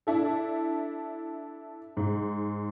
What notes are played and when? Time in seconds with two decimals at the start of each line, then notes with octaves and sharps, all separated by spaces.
0.07 D4 E4 A4
1.97 G#2